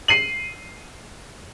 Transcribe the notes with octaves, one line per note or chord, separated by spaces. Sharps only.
C7 D#7 F#7